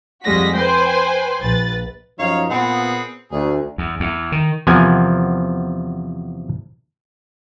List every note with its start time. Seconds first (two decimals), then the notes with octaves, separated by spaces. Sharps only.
0.24 F2 G3 G#3 F#4 A#6 B6
0.56 B4 C5 G5 G#5 C6
1.42 A#1 B4 A6
2.19 F#2 F3 D#4 C#5 F5
2.50 A#2 B3 C4 G#4 F#5
3.32 D2 G#4
3.78 E2
4.00 E2
4.32 D#3
4.67 E2 C3 F3 B3 A#4 G#5